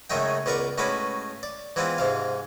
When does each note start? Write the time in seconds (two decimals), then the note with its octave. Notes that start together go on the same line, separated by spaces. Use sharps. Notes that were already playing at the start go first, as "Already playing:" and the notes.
0.10 F#2 C#3 G#3 A3 D#4 G5
0.46 C#2 B3 A#4 D5 C#6
0.78 A2 G#3 C#4 F#4 B4 D6
1.43 D5
1.76 E3 G#3 B3 C4 F4
1.98 G#2 C3 F5